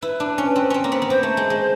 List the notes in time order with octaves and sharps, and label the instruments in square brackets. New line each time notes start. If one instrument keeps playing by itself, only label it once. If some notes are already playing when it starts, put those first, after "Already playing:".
[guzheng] E4 [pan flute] B4
[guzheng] D4
C#4
C4
C4 C#4
A#3
B3
B3
[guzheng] A#3 [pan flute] C5
[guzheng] A3
G#3
G#3